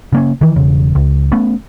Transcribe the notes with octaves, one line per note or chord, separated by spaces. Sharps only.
C#3 A#3 C#4
D#3 E3
E1 C#3
C#2
A3 B3 C#4